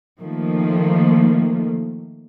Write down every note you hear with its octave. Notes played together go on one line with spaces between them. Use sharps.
D#3 F3 A3 A#3